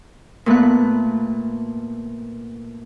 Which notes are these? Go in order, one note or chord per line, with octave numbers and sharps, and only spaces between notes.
A#2 A3 B3 F#6